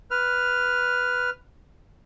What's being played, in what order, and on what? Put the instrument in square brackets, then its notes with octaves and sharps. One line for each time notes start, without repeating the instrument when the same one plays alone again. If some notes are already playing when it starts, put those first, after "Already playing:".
[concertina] B4 F6